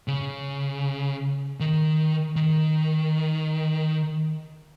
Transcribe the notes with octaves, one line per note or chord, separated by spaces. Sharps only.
C#3
D#3
D#3